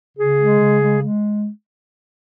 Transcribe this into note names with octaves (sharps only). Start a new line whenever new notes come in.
C#3 G#4
G#3
C#3
G#3
G#3